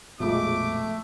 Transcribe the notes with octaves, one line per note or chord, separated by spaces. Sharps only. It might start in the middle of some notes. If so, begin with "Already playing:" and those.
A#1 F2 B2 F3 G#3 A3 D6